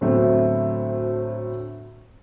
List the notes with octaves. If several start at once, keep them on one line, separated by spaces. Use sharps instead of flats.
D2 A2 F#3 A3 B3 C4